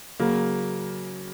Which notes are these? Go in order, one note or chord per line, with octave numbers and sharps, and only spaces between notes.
C#3 F#3 A#3